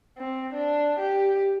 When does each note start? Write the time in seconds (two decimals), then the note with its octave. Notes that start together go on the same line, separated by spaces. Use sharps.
0.18 C4
0.54 D4
0.99 G4